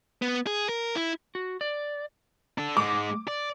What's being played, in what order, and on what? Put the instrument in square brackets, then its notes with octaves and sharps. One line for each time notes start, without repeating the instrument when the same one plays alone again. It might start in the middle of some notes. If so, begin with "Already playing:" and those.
[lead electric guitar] B3
G#4
A#4
E4
[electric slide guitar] F#4
D5
[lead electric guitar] D4 A4
[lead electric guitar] G#2 G#3 [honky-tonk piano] D6
[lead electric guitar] D5